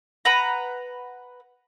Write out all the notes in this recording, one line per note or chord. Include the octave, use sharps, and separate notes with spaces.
B4 F#5 A#5